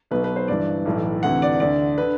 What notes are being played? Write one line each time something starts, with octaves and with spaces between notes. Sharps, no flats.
B1 B2 B4
B4
C5
G1 G2 E3 D5
B1 A2 E3
D2 C3 E3 F#5
D5
D2 D3 D5
D3 B4